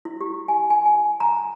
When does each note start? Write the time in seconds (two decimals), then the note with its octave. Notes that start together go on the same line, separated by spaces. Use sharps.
0.05 E4
0.21 G4
0.48 G#5
0.70 G#5
0.86 G#5
1.20 A#5